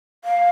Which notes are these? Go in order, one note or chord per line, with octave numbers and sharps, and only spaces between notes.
F5